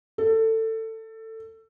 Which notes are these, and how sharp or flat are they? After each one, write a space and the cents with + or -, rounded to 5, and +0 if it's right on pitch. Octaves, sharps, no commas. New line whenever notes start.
A4 +20